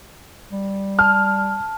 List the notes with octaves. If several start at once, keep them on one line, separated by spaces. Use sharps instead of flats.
G3
A5 F6